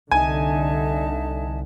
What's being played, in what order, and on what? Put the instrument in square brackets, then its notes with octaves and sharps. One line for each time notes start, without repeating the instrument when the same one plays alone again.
[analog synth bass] C2 [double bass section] D3 [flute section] D#4 E5 A5 [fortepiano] G#5